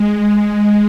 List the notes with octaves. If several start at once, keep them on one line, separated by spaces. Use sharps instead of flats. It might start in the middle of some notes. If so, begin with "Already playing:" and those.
Already playing: G#3